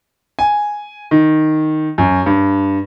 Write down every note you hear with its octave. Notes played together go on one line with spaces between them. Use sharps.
G#5
D#3
F#2
G2